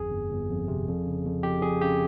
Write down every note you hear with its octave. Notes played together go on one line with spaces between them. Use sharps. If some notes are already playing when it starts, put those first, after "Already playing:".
Already playing: G1 F2 G#4
G1
G1
F2
C3
F2
C#3
F2
F2 G4
F2 G#4
C#3 G4